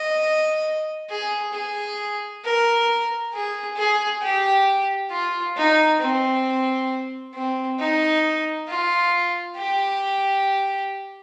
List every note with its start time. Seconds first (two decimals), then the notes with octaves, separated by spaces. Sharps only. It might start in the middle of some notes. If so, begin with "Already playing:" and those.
Already playing: D#5
1.10 G#4
1.54 G#4
2.44 A#4
3.33 G#4
3.77 G#4
4.22 G4
5.11 F4
5.56 D#4
6.00 C4
7.34 C4
7.79 D#4
8.68 F4
9.57 G4